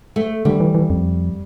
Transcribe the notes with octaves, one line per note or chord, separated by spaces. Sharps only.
A3
D3 G3
E3
E3
F2